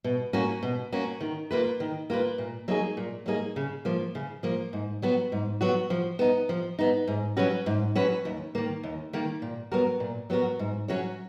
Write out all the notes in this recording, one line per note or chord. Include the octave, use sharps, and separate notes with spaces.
B2
A#3 C#4 F#4
B2
A#3 C#4 F#4
D#3
A#3 F4 B4
D#3
A#3 F4 B4
A#2
F#3 A#3 D#4 G#4
A#2
F#3 A#3 D#4 G#4
C#3
F3 A#3
C#3
F3 A#3
G#2
F#3 B3 F#4
G#2
F#3 B3 F#4
F3
B3 D#4
F3
B3 D#4
G#2
F#3 C#4 F#4 B4
G#2
F#3 C#4 F#4 B4
D#2
D#3 A#3
D#2
D#3 A#3
A#2
F#3 B3 F#4 A#4
A#2
F#3 B3 F#4 A#4
G#2
F#3 C#4 F#4 C#5